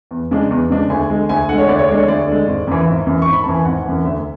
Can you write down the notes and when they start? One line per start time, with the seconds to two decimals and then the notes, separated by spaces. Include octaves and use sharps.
0.11 E2
0.31 C#3 G#3 D4
0.51 E2
0.70 C#3 G#3 D4
0.90 D2 G#5
1.10 D3 G#3
1.29 D2 G#5
1.49 D3 G#3 F#5
1.58 C#5
1.69 D2 D5
1.79 C#5
1.88 D3 G#3 D5
1.98 C#5
2.08 D2 D5
2.28 D3 G#3
2.47 G#1
2.67 F#2 E3
2.87 G#1 E5
3.06 F#2 E3
3.22 G#1 C#6
3.33 B5
3.44 F#2 E3 A5
3.54 G#5
3.65 G#1 F#5
3.85 F#2 E3
4.05 D2 E5